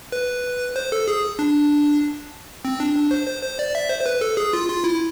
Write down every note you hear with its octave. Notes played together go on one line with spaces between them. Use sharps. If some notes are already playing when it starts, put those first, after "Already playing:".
B4
C5
A4
G#4
D4
C4
D4
D4
C5
C5
C5
D5
E5
C5
C5
B4
A4
G#4
F4
F4
E4